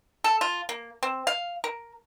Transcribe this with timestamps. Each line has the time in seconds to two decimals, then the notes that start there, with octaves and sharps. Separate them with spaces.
0.24 A4
0.41 F4
0.69 A#3
1.03 C4
1.27 F5
1.64 A#4